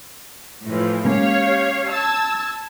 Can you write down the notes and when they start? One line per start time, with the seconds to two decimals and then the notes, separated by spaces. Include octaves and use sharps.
0.67 A2 E3 F3
1.05 G#3 A#3 C#4 G4 C#5 F5
1.90 A5 E6 G#6